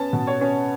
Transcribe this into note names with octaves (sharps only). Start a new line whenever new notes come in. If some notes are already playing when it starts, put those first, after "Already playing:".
Already playing: B3 C#4 A5
B2
C#5
C#4